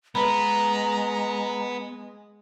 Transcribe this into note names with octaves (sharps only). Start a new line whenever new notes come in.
G#3 B3 B4 A#5 B5